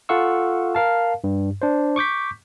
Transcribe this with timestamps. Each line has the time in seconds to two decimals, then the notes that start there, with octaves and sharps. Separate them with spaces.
0.09 F4 A4 F5 F#5 C#6 E6
0.75 A#4 F5 A5
1.24 G2
1.62 D4 C5
1.96 C#6 D6 G6 B6